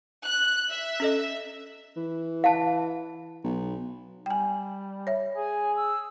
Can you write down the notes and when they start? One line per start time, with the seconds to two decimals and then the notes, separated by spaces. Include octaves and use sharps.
0.23 F#6
0.70 E5
1.00 C#4 A4 D#5
1.97 E3
2.44 F5 A5
3.44 B1
4.26 G3 G5 G#5
5.07 C#5 E5
5.36 G#4 G#5
5.76 E6